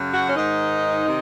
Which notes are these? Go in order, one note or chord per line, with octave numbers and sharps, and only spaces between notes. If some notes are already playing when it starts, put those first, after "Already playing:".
Already playing: F#2 C#3
F#4
C#4
G#2 D#3 D#4
C3 D#3